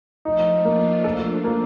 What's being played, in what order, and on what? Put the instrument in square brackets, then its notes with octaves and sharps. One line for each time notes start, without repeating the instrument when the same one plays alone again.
[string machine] F3 A3 [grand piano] D#4
[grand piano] A#3 [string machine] D4 F4
[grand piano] A4
A#3